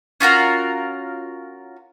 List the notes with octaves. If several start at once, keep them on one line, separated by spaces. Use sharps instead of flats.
C#4 F4 F#4 A#4